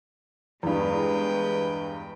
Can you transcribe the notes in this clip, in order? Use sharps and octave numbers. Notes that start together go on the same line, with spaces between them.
E2 G2 G#3 B4 G5